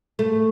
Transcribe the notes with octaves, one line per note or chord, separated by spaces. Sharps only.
A3